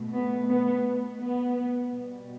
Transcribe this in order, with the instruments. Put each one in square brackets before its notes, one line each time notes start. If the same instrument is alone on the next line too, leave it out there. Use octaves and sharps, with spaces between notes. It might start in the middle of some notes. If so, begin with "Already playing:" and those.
Already playing: [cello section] B2 A3
B3
B3
B3
B2 G3